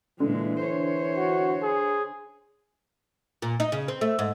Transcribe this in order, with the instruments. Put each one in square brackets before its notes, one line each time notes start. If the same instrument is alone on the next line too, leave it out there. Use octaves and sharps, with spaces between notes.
[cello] A#2 G#3 [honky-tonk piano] D3 [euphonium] E3
[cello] C5 C#5
[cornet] F#4
G#4
[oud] A#2
D#4
C#3
C4
A3
G#2